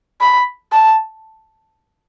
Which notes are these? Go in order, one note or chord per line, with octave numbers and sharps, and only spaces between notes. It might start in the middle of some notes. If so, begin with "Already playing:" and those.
B5
A5